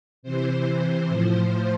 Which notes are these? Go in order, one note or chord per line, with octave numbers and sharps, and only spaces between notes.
C3 E3 C5
A2 F3